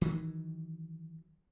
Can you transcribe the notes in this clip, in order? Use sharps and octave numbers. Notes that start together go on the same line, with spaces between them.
D#3 E3 F#3